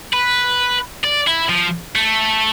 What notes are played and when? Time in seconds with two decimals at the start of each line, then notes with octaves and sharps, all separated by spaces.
0.13 B4
1.04 D5
1.28 E4
1.50 F3
1.96 A3